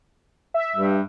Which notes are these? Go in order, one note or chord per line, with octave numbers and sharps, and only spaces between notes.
E5
G2